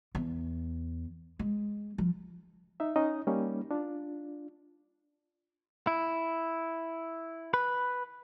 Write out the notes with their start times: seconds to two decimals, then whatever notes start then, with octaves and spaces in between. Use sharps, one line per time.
0.15 E2
1.39 G#3
1.98 F3
2.80 D#4 E5
2.96 C#4 D#4 D#5
3.27 G3 A#3 C#4 D#4
3.71 D4 F4
5.87 E4
7.54 B4